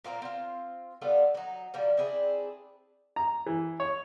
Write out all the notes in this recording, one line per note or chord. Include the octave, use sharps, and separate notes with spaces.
A#2 A#3 C4 A#5
C4 F4
G3 B3 F4 A4
F#3 D#4
B2 F3 G3 A#3
C4 D4 E4 G#4
A#5
E3
C#5